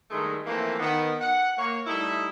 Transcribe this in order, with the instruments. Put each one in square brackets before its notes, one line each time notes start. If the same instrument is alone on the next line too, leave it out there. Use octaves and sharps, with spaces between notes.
[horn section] G2 D#3 G#3 A3
E3 F3 A3 A#3 C4
D#3 B3
F#5
A#3 C#5
G3 A3 D#4 E4